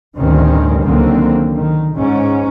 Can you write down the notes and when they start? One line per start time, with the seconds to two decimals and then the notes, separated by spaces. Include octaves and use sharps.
0.17 A1 D2 G2 D#3 C4 C#4
0.82 C#2 D3 D#3 F#3 A#3 C4
1.57 D#3
1.95 G#2 C#4